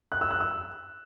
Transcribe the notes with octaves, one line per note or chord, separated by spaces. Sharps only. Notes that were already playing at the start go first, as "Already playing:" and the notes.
F#6
E6
F#6
E6